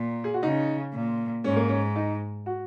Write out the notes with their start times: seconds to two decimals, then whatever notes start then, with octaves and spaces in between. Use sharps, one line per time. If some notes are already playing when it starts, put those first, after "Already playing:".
Already playing: A#2
0.24 G#4
0.34 F#4
0.43 C#3 D#4
0.94 A#2
1.44 G#2 C#4
1.56 A#3
1.68 C#4
1.96 D#4
2.46 F#4